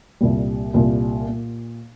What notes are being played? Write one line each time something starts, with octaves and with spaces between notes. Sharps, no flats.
C2 A#2 G3
C2 A#2 G3
A#2